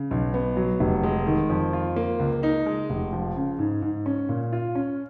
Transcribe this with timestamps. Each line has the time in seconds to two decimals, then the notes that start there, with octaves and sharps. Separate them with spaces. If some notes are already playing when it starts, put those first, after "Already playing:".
Already playing: C#3
0.11 B1
0.34 B3
0.57 F#3
0.80 F1
1.03 G#3
1.27 D#3
1.50 F2
1.73 F4
1.96 A#3
2.19 C#2
2.43 D#4
2.66 G#3
2.90 F1
3.13 F3
3.36 C#3
3.59 G#2
3.82 G#2
4.06 C#4
4.29 A#2
4.53 F4
4.75 C#4